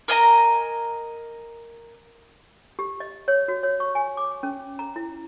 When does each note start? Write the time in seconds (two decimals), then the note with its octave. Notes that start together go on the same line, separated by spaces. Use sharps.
0.08 A#4 D#5 G#5 A#5
2.79 G4
3.00 D#5
3.28 C#5
3.48 F#4
3.63 C#5
3.80 C#6
3.95 G#5
4.17 D6
4.43 C#4
4.79 A#5
4.96 E4